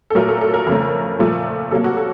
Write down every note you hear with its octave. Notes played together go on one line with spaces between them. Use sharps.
A4
A#2 F#3 A3 A#4
A4
A4
A#4
F2 C#3 A3
A#2 F3 A3
C3 F#3 A#3 A4
F#4
A4